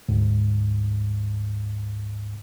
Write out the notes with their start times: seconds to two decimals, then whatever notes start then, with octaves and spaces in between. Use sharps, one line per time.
0.09 D2 G#2